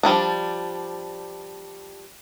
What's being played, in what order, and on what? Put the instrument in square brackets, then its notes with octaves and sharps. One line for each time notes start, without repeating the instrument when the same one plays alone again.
[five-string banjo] F3 G3 A3 D4